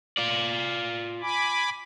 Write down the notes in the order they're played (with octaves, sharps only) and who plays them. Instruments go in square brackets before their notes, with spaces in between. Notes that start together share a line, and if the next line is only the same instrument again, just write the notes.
[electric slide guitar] F4 D5
[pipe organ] G#5 B5 D6